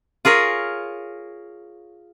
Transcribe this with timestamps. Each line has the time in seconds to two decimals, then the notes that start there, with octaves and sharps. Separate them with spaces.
0.25 F4 G#4 A#4 C#5